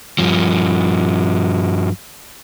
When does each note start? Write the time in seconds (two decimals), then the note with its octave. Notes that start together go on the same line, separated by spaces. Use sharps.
0.19 G2 F3